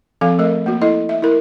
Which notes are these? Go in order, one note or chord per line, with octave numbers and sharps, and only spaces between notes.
F3 C4 A4 F5
A3 A#4 D#5
A#3 F#4
E4 A4 D#5
E5
E4 A#4